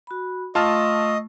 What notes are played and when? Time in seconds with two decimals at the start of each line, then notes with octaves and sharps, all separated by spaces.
0.07 F#4 B5
0.55 A3 F4 D#5 A5 C#6 E6 F6